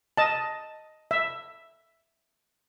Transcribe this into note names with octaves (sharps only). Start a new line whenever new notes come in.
D#5 A5
E5